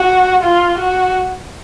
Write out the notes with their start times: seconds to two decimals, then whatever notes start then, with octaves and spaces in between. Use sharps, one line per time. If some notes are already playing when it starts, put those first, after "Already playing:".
Already playing: F#4
0.43 F4
0.78 F#4